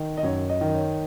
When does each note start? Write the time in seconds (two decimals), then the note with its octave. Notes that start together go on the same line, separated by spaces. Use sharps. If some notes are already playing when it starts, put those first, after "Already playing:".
Already playing: D#3
0.17 D#5
0.23 F#2 C#5
0.49 D#5
0.61 D#3
0.74 C#5